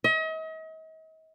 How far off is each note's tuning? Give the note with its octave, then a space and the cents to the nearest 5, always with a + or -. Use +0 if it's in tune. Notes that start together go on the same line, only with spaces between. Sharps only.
D#5 +40